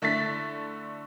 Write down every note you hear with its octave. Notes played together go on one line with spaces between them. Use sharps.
D3 A3 E4 A6 B6